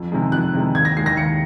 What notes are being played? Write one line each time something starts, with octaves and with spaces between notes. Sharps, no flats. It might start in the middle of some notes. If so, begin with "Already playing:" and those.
Already playing: F2
C3 D#3 G#3
F2 F#6
C3 D#3 G#3
D#2 G#6
A#6
D#3 G#3 C7
A#6
D#2 C#7